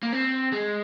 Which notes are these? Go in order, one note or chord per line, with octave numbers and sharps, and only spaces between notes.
A#3
C4
G#3